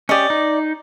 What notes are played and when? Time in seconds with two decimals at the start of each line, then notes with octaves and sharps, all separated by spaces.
0.09 C#4 G4 D5 D#5
0.30 D#4